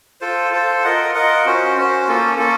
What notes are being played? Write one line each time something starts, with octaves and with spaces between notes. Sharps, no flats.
F4 A4 C5
F4 A4 C5
F4 A#4 D#5 F#5
F4 A#4 D#5 F#5
C#4 F#4 C5
C#4 F#4 C5
A#3 C#4 F4 A4
A#3 C#4 F4 A4